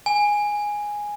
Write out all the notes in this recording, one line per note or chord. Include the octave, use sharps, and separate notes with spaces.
G#5